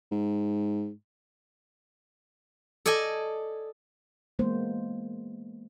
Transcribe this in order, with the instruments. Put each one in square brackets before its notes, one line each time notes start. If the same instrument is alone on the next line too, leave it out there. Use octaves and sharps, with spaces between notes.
[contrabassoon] G#2
[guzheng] A4 D5 D#5 G#5
[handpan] E3 G#3 A#3 B3 C5